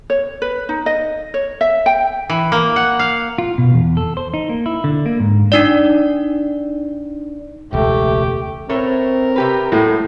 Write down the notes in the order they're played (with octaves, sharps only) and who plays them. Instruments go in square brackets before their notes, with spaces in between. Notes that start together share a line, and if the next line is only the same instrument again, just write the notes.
[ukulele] C#5
B4
D#4
D#5
C#5
E5
G5
[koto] E3
A#3
F#5
F5
[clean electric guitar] F4
B2
E2
A4
C5
D#4
A#3
E4
D3
A#3
G#2
[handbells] D4 D#4 D5
[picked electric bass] E1 C#2 [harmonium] A3 [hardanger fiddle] G4
[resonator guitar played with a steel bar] A2 A3 C#5 [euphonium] C4 [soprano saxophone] A#4
[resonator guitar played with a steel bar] C3 G4 B4
[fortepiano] A2 [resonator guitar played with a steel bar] F#3 G#3 [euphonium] A4